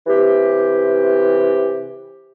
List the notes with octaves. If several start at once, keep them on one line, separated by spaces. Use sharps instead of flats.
C3 E3 G4